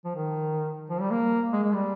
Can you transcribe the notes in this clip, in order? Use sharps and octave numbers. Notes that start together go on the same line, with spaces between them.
F3
D#3
F3
G3
A#3
G#3
G#3
G3